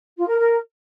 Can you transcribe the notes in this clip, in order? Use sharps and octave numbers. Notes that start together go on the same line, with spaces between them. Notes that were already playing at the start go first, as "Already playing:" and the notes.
F4
A#4
A#4